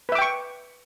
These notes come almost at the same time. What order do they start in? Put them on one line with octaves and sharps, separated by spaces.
B4 E5 D6 G5 C#6